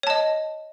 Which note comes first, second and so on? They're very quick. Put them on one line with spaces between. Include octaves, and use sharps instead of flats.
C#5 A5 D#5